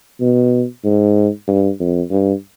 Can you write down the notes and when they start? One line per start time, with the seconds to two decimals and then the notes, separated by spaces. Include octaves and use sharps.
0.20 B2
0.84 G#2
1.47 G2
1.80 F2
2.11 G2